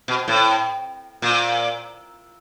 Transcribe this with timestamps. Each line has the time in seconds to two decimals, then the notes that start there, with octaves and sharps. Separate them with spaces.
0.08 B2
0.28 A2
1.22 A#2